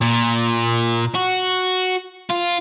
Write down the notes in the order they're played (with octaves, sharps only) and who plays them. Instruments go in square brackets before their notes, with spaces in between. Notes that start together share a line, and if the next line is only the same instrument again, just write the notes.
[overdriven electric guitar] A#2
F#4
F4